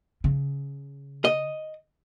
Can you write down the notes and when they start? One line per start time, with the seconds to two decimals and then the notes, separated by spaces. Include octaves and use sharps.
0.24 C#3
1.25 D#5